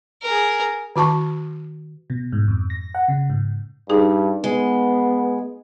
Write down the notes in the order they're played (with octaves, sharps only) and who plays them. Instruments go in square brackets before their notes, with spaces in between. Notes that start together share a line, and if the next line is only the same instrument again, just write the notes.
[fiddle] G#4 A#4
[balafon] D#3 F#4 A5 C#6
[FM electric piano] B2
G#2
F2
A#6
F#5
C#3
G#2
[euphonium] G2 [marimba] D#4 G#4
[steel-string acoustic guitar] G#3 [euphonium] B3